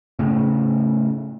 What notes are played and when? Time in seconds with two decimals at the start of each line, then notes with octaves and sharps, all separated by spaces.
0.19 A2 C#3